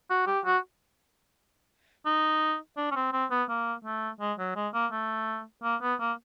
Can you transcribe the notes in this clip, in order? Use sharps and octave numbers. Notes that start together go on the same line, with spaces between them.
F#4
G4
F#4
D#4
D4
C#4
C4
C4
B3
A#3
A3
G#3
F#3
G#3
A#3
A3
A#3
B3
A#3